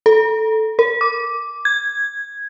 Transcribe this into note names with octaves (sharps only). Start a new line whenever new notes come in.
A4
A#4
D6
G#6